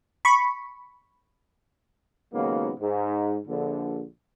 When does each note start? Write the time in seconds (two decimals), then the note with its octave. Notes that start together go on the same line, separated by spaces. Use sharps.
0.25 B5 C#6
2.33 D#2 G#2 C#3 F#3 A#3 B3
2.80 G#2
3.47 A#1 D3